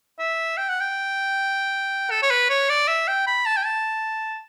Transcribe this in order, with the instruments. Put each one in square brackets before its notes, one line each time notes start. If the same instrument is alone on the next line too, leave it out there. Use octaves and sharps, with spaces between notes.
[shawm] E5
G5
F#5
G5
A4
C#5
B4
C#5
D5
E5
G5
B5
A5
G5
A5